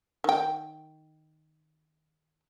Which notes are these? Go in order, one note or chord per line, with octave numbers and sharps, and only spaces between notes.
D#3 G5